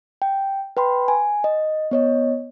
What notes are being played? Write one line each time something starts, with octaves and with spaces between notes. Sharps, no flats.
G5
B4 G5 B5 C6
G#5
D#5
B3 C#5 D#5